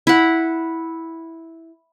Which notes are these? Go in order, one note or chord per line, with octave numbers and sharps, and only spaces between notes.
E4 F#5